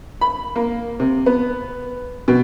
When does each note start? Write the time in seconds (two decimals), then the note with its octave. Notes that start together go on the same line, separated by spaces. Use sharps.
0.21 B5
0.56 A#3
1.00 C3
1.26 B3
2.28 B2